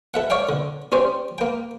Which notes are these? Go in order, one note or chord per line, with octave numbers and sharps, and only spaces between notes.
A4 E5 F#5
C#5 D5 F5 G5
D3
C#4 G4 C5 D5
A#3 G5